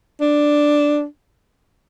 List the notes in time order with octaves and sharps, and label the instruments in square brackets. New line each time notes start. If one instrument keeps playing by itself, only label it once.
[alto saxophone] D4